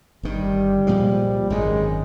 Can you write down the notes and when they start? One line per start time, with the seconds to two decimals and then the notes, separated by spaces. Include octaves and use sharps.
0.23 G1 G2 D#3 G3
0.87 C2 A#2 F3 G#3
1.50 G#1 F#2 D#3 G#3